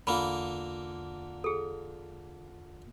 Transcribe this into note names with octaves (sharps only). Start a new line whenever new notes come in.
E2 D3 A#3 F4 B5
G#4 A4